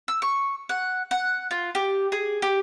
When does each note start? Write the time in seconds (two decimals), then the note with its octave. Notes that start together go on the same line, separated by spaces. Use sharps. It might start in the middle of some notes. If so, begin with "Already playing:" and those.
0.08 E6
0.22 C#6
0.69 F#5
1.11 F#5
1.51 F4
1.75 G4
2.12 G#4
2.42 G4